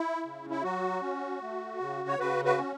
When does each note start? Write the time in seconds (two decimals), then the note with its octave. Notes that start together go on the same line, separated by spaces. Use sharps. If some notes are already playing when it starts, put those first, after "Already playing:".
Already playing: E4
0.25 C#3
0.50 E4
0.63 F#3 F#4
1.02 C#4
1.42 A3
1.80 C#3
2.09 C#5
2.19 C#3 F#4 B4
2.45 F#4 B4
2.58 C#4